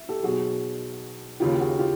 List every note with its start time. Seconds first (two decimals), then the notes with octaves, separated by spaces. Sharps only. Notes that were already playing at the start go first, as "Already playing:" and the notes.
Already playing: E5
0.09 G4 A4
0.23 B1 B2 F#4 G#4
1.40 D#2 C#3 F3 F4 G4
1.55 G4
1.60 F#4 G#4
1.79 F4 G4